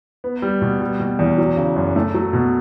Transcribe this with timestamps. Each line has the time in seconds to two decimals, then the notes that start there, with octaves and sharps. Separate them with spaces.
0.24 B3
0.42 G3
0.62 B2
0.81 G3
1.00 B2
1.19 E2
1.38 F#3
1.57 C#3
1.77 F#2
1.96 A3
2.15 F#3
2.33 B2